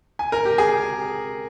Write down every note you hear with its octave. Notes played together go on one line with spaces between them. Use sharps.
G#5
A#4
G4
G#4